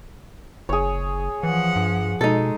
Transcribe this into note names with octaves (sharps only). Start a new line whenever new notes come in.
F#1 G#4 C#5
E3 F3 F#5
G2
B2 G#3 D#4 A4